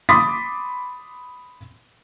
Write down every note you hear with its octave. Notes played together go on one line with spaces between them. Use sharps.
B5 C6 D6 D#6 A6 B6